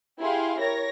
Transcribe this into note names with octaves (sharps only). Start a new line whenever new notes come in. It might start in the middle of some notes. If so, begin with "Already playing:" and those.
E4 G4 G#4 F5 C6
A#4 C#5 A#6